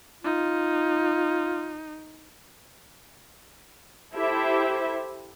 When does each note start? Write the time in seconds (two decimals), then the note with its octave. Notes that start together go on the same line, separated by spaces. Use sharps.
0.24 D#4 F4
4.15 E4 G4 A4 C5 E5